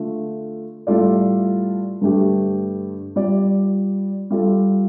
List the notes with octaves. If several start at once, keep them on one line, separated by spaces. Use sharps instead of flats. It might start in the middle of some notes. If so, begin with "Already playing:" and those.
Already playing: D3 A3 F4
A2 G3 F4 A4 D5
G2 D3 A3 D4 G4
G3 F4 D5
G3 F4 A4